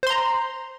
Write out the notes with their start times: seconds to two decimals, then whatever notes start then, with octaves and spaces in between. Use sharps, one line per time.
0.03 C5
0.07 C6
0.10 A#5